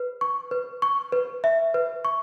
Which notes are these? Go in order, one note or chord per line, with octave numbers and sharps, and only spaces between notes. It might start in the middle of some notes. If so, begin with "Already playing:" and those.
Already playing: B4
C#6
B4
C#6
B4
E5
B4
C#6